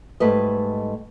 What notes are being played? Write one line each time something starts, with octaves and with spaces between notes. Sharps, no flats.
G#2 G3 A3 B4 D#5